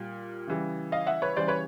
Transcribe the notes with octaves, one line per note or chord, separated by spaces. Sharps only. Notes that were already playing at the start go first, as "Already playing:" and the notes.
Already playing: A#2 G3
C#3 E3 G3
D#5 F5
E5 F#5
B4 C#5
C#3 E3 G3 C5 D5
B4 C#5